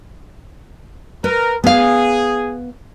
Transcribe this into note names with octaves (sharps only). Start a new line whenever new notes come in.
A#4 B4
B3 G#4 F5